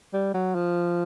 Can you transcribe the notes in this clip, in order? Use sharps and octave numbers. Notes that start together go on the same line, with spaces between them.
G3
F#3
F3